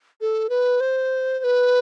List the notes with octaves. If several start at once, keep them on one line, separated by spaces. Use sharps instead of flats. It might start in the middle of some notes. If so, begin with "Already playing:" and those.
A4
B4
C5
C5
B4